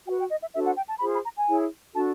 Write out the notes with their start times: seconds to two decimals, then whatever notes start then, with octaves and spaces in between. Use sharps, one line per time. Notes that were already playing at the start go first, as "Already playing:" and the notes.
0.07 F#4 B4 G5
0.20 G5
0.31 D#5
0.43 E5
0.54 D4 F#4 A4 C5 E5
0.66 F#5
0.78 G5
0.89 A5
1.00 F4 G#4 C5 B5
1.13 B5
1.24 A#5
1.36 G#5
1.48 E4 G#4 C#5
1.94 D4 F#4 A4 A5